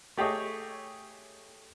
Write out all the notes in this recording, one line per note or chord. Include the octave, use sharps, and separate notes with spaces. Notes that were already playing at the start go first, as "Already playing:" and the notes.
A3 G4 G#4 C#5 D#5